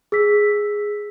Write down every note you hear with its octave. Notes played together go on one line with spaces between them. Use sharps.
G#4 E6 B6